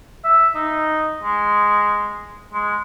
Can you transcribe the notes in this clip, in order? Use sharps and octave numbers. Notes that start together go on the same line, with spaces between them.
E5
D#4
G#3
G#3